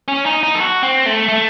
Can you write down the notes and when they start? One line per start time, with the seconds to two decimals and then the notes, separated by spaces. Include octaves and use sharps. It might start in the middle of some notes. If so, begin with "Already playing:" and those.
0.08 C#4
0.26 D#4
0.43 D#4
0.55 A4
0.60 F#4
0.83 C4
1.06 A3
1.28 A3